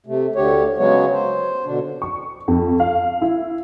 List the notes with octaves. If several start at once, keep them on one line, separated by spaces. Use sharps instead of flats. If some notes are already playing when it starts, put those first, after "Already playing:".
C3 A3
D2 D3 A3 G4 C#5
C#3 F#3 G#3 B3 C#5
C5
B2 D3 D4
C#6
F2
F5
E4